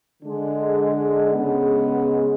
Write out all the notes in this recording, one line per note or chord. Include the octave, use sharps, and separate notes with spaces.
D3 G#3 D4
C#3 G#3 B3